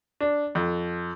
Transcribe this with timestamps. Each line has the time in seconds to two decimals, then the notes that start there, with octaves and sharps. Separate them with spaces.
0.20 D4
0.55 F2